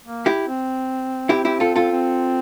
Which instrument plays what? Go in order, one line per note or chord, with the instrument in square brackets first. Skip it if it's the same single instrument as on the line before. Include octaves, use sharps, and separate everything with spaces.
[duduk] A#3
[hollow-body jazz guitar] E4 G4
[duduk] C4
[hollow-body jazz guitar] E4 G4
E4 G4
F4 A4
F4 A4
[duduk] C4